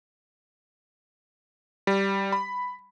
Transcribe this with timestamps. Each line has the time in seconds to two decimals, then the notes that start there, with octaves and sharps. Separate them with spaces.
1.87 G3
2.32 B5